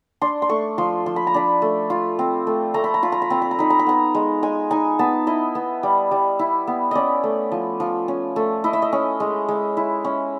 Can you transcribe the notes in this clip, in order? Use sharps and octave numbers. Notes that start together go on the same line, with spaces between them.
D4 C6
C6
A3 C#6
F3 C6
F3 C6
B5
A#5
D4 B5
A3
F4
C4
A3
A3 A#5
B5
A#5
F4 B5
A#5
B5
C4 A#5
B5
A#5
D#4 B5
A#5
B5
B3 A#5
G#3
G#3 G#5
D#4 G#5
B3 A5
E4 D#5
B3
G3
G3
E4
B3
C#4 D5 D#5
A3
F3
F3
C#4
A3
E4 D#5
E5
D#5
C#4
G#3
G#3
E4
C#4